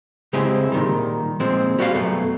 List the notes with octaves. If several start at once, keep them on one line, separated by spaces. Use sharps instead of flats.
C#3 G#3 C4 E4 G4 G#4
A#2 D#3 G3
A#2 F3 G#3 C4
G3 F#4 D5 F5
F#2 B2 A3